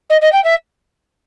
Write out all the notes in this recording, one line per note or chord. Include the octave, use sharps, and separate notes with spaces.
D#5
D#5
G5
E5